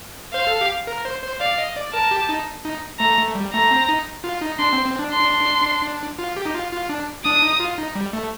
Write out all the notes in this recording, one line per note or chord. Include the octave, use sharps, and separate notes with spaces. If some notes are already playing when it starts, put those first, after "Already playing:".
C5 F5
A4
G4
A#4
C5
C5
D5 F5
D#5
D5
A#4 A5
G4
D#4
D#4
A3 A#5
A3
G3
A3 A#5
C4
D#4
F4
D#4
D4 C6
C4
C4
D4
C6
F4
G4
D#4
F4
F4
D4
D4 D#6
D#4
F4
D#4
G3
A3